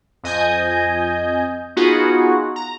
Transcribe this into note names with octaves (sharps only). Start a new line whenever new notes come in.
F2 D#5 G#5 G6
B3 D#4 F4 F#4 G#4
A#5